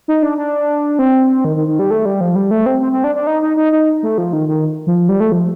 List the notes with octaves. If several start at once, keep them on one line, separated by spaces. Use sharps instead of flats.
D#4
D4
D4
C4
D#3
D#3
D#3
G3
A3
G3
F3
G3
A3
C4
C4
C4
D4
D4
D#4
D#4
D#4
D#4
A3
F3
D#3
D#3
F3
G3
A3
F3